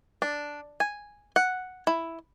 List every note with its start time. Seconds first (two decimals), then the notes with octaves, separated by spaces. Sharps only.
0.22 D4
0.80 G#5
1.36 F#5
1.87 E4